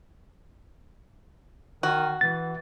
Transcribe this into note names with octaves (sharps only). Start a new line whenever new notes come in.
D#3 F#4
E3 A6